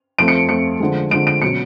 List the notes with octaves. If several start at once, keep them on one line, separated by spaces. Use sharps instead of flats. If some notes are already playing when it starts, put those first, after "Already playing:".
F2 F3 A3 D7
C#7
F2 F3 A3 C#7
D3 F3 G#3
D3 F3 G#3 D7
D7
B2 F#3 C#4 C#7